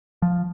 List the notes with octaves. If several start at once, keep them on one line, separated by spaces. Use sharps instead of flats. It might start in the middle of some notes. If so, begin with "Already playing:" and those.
F3